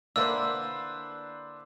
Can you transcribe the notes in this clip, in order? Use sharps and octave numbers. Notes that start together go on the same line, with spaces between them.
D3 A#3 D4 E4 B4 C5 E6